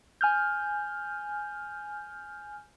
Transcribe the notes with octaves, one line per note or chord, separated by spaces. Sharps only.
G#5 F6 G6